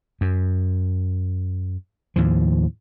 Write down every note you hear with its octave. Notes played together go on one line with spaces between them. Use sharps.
F#2
D#2 A2 F3